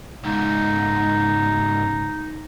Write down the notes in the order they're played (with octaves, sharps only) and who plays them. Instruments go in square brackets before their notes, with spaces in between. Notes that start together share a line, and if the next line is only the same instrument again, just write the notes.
[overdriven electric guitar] C#2 G#2 [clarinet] D#4